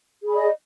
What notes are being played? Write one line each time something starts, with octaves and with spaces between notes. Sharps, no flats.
G#4 D5 D#5 B5